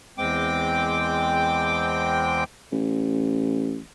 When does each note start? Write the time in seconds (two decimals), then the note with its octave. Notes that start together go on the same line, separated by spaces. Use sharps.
0.18 E2 G#3 C4 G5 D6
2.72 A1